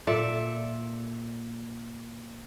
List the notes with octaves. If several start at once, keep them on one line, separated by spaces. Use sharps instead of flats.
A#2 A4 D5 E5